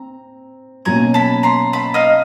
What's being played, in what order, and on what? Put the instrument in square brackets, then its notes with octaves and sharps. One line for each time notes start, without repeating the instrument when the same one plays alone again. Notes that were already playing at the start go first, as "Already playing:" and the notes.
Already playing: [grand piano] C4 [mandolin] A#5
[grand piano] B2 F#3 A#3 C#4 [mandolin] G#5 A#5
[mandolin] A5 B5
A#5 C6
A5 B5
D#5 F5